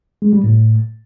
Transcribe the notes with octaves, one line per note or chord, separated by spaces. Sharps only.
G#3
G3
A2